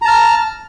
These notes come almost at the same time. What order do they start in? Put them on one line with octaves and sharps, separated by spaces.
A#5 A5 F6